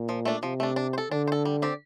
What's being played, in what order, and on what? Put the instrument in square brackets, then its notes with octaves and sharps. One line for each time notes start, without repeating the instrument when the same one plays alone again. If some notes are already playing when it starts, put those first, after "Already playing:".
Already playing: [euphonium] A#2
[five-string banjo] F3
A3 D4
[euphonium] C3 [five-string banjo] F3
[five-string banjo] A3 D4
D4
C5
A4
[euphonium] D3 [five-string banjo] D4
[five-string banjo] C5
A4
G3
C4 G4 D5